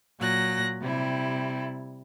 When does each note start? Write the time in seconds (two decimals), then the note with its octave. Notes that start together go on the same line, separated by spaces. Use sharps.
0.20 A#2 F#3 F#6 A#6
0.82 C3 G3 E4